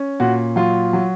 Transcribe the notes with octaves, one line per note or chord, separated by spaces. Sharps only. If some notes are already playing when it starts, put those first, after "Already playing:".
Already playing: C#4
A#2 F#4
F#3 F4
F#3